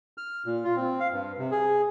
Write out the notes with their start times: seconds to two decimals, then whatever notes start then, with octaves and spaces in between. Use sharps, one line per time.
0.18 F6
0.46 A#2
0.64 F4
0.76 C4
1.00 F5
1.12 G2
1.38 C3
1.51 G#4